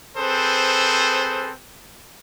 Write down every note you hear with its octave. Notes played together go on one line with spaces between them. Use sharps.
C4 G#4 A4 B4 C5